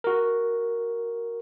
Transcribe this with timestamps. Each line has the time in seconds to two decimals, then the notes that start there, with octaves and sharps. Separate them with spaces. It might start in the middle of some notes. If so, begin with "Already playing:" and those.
0.04 F#4 A#4